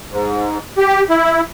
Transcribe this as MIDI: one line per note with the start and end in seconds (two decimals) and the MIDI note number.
0.11 0.58 44
0.78 1.02 67
1.10 1.41 64